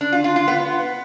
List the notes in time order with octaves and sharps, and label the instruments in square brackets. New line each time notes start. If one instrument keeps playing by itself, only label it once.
[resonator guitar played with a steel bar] D4
F4
F4
F4
B3